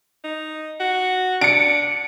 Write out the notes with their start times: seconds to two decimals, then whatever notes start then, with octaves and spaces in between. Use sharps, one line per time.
0.24 D#4
0.80 F#4
1.41 D4 C#7 D7